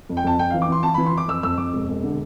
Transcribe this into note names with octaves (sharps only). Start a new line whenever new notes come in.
F2
G5
F2 A5
F2 G5
E3 F5
D6
E3 C6
E3 A5
E3 B5
C6
E3 D6
F2 E6
F2 E6
F2 D6
E1
E1
D3